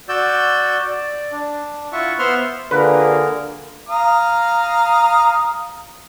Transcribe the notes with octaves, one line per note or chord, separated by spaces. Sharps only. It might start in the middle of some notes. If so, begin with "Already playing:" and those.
F#4 D5 E6 G6
D5
D4
E4 F4 E5 F#5 C#6
B3 C5 E5 F#5 C6 F6
D3 A#3 F4 G#4 A#4 B4
F5 A#5 D#6